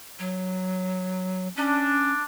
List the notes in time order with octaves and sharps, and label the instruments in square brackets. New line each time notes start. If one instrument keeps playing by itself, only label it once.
[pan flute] F#3
[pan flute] C#4 [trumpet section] D4